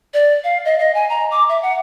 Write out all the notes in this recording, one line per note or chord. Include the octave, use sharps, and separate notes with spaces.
D5
F5
D#5
D#5
G#5
A#5
D6
E5
F#5